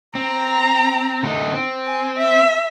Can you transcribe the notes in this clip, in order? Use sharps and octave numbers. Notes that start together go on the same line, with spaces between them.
C4 A#5
D3 A3 D#4
C4
G#5
E5